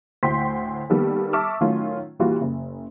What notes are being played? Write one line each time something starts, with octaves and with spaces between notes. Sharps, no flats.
D2 A2 C5 G5 C6 B6
D#3 G3 A#3 B3 A4
E5 A5 C#6 D6 E6 F6
A2 D#3 F#3 A3 C#4 F4
A#2 E3 G3 F4 F#4
F#1